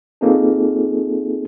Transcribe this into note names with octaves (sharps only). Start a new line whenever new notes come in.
A#3 C4 D#4 F4 G#4 A4